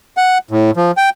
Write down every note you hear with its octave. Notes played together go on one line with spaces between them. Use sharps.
F#5
A2
F3
G5